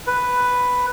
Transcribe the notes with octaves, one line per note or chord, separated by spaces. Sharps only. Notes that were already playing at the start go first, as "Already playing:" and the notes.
B4